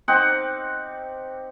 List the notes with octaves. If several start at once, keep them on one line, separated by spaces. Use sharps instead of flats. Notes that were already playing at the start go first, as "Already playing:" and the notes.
C4 D#4 G4 F#5